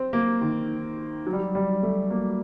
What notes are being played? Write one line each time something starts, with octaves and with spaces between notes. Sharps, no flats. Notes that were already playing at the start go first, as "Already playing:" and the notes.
Already playing: C4
A#3
D#3
F#3
G3
F#3
G3
A3
A#3